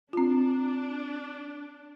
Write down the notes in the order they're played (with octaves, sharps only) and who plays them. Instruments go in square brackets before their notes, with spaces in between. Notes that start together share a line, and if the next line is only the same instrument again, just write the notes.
[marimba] C4 F4 [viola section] D4